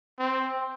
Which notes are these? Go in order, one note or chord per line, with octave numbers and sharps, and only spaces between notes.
C4